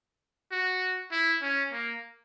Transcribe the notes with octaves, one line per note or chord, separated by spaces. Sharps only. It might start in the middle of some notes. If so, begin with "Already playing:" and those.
F#4
E4
C#4
A#3